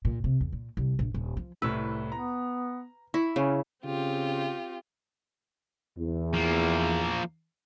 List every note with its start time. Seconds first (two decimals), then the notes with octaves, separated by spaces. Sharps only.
0.05 A#2
0.24 C3
0.41 E2
0.52 A#2
0.77 C2
0.99 A#1
1.14 D#1
1.37 F3
1.62 C2 A2 B4 E6
2.12 B3 A#5
3.14 E4 C#6
3.36 C#3 C#4
3.84 C#3 C4 F4 G4
5.97 E2
6.34 F3 A#3